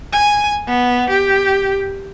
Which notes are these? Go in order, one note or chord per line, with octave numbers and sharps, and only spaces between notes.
G#5
B3
G4